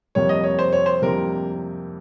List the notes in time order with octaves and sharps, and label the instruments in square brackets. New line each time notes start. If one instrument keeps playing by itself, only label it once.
[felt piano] F2 C3 G3 A#3 [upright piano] C#5
[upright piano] D#5
C#5
C5
C#5
C5
[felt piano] F2 C3 G3 A#3 [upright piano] A#4